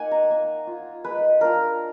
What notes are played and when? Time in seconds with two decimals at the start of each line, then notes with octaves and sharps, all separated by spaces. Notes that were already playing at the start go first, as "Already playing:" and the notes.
Already playing: A#3 D#4 F#5 G#5
0.11 A#5
0.30 A#3 G#5
0.67 F4
1.04 G#3 B4
1.41 D4 F4 A#4